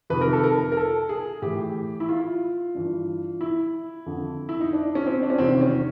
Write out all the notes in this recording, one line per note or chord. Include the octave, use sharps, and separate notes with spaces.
F2 C3 D#3 B4
A#4
A4
A#4
A#4
A4
G#4
A2 E3 G4
E4
F4
G2 E3
E4
F2 D3
E4
D#4
D4
C#4
C4
D4
C#4
E2 C3 D#3 C4
C#4